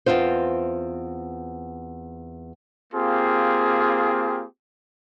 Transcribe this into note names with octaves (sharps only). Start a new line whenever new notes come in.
E2 G2 C4 F4 C5
A#3 C4 F4 G4 G#4